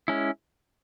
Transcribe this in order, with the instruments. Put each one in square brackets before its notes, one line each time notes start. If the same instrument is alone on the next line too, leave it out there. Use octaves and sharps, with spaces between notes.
[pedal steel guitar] G#3 C#4 E4